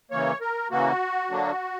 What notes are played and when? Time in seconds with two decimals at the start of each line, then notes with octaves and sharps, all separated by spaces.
0.11 C#3 E3 A#3 C#5
0.41 A#4
0.71 C#3 E3 A#3 F#4
1.30 D3 F#3 A#3 D4